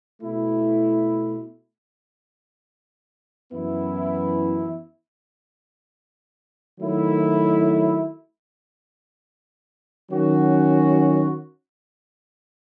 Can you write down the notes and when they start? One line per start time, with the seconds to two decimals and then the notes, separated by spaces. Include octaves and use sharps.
0.21 B2 A3 E4
3.51 F#2 E3 B3 E4
6.80 D#3 F#3 A3 E4
10.10 D#3 F#3 C#4 F#4